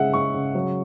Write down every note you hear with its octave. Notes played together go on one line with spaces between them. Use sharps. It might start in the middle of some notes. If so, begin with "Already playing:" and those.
Already playing: C#3 G#3 E5 F#5
G#3 C#6
C#3
F#3